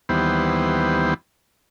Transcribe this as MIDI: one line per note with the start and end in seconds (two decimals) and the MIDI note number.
0.09 1.14 39
0.09 1.14 52
0.09 1.14 55
0.09 1.14 59
0.09 1.14 72